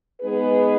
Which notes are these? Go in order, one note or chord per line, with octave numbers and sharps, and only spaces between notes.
G#3 B3 D#4 G#4 B4